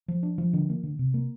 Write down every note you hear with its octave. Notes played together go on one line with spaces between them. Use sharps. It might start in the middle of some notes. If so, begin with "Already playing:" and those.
F3
D4
F3
D3
A#3
D3
C3
A#3